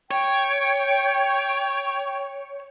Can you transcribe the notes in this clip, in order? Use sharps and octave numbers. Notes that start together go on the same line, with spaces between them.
C#5 G5